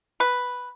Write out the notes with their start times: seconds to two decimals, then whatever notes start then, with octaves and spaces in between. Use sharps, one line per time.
0.20 B4